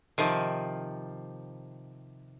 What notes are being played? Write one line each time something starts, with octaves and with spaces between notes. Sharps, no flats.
C3 D#3 F3